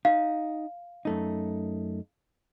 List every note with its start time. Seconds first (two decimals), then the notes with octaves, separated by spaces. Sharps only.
0.05 D#4 F5
1.05 F#2 A3 D#4